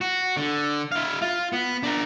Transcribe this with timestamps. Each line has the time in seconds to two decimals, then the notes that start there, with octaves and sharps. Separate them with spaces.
0.01 F#4
0.37 D3
0.92 E4 F5
1.22 F4
1.52 B3
1.83 D4 A#4